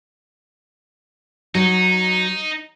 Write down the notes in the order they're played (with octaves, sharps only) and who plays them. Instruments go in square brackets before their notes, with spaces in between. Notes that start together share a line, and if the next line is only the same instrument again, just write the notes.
[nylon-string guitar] F#3 [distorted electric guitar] D#4